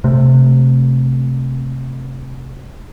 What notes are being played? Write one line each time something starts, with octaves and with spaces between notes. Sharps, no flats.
C3 A3